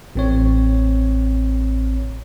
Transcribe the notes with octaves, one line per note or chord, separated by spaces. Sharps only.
A1 C4 C#5